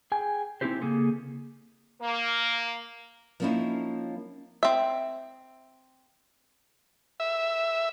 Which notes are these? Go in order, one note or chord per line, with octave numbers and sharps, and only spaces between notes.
G#4 G5 G#5
C4 C#4 D#4 E4 G4 C5
C#3 A#3 G#4 A4
A#3
F3 A#3 C4 C#4 D#4 E4
C4 E5
E5